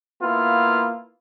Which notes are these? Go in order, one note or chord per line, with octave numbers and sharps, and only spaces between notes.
A#3 B3 E4 F4